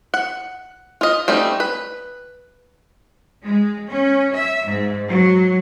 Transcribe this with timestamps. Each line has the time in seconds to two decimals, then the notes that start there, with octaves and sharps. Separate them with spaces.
0.14 F#5
1.01 F4 D#5
1.28 G3 A3 C4 C#4 D#4
1.60 B4
3.43 G#3
3.89 C#4
4.33 E5
4.66 G#2
5.09 F#3